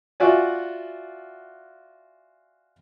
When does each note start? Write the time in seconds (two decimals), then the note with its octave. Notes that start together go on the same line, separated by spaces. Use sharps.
0.20 F4 F#4 D5 E5 F#5 G#5